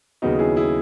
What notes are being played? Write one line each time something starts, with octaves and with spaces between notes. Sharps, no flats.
D#2 C#3 F#3 B3 D#4 F#4
E4 G#4
E4 G#4